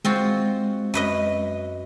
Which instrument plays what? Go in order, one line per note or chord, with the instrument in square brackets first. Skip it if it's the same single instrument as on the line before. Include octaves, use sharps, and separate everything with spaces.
[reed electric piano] G#3 [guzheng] C4 F4 F#4
[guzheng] F#2 B4 D#5